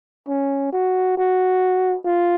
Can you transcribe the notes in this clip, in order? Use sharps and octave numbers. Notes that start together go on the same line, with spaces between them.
C#4
F#4
F#4
F4